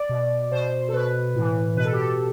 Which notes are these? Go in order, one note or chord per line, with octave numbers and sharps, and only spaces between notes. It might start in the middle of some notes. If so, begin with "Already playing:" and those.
Already playing: D5
B2
B2 C5
A4
B2 B4
A2 E3
B2 B4
A4
G4
A4